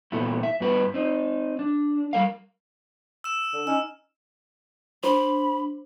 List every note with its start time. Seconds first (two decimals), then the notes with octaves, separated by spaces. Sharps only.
0.12 A#2 E3 A3 B3 E4 F#4
0.43 E5
0.60 G2 B3 F#4 B4
0.94 C4 D#4
1.59 D4
2.13 G3 A#4 F5
3.24 E6 E7
3.54 D3
3.67 C#4 D#4 E6
5.03 D4 C5 B5